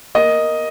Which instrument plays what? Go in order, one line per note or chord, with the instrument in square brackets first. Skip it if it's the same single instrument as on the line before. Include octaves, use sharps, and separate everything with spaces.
[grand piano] A#3 D#5